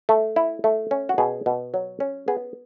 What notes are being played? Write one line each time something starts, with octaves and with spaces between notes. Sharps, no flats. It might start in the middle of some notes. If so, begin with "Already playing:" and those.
A3
E4
A3
C#4
F#4
B2 G#4
B2
F#3
C#4
B3 G#4